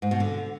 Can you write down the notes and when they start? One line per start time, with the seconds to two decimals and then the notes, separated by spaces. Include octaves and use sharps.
0.02 G#2
0.11 B2
0.20 D3